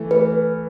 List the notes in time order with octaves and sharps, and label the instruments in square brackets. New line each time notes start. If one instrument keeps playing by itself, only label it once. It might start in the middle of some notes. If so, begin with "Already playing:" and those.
Already playing: [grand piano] E3 A3
[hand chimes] B4